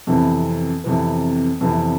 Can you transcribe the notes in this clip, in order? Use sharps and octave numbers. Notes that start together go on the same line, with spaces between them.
F2 C3 E3 B3
F2 C3 E3 B3
F2 C3 E3 B3